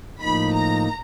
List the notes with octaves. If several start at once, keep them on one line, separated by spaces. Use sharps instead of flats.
A2 F3 A#3 D#4 B5
A#5